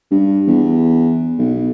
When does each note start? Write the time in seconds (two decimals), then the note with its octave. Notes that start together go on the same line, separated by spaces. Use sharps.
0.11 G2
0.47 E2
1.38 B1